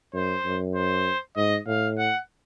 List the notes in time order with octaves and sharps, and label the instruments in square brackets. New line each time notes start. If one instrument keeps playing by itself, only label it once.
[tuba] F#2 [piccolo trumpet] C5
[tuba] F#2
[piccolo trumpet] C5
[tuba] G#2 [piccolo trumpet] D#5
[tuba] A2 [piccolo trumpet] F5
[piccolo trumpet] F#5